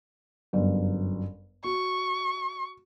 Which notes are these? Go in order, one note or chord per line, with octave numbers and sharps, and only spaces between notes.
G1 F#2
F#4 C#6